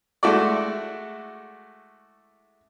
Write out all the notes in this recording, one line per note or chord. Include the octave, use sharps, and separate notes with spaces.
G#3 A3 E4 F#4 A4 D5